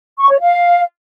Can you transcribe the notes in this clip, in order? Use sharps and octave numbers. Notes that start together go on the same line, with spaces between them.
C#6
C#5
F5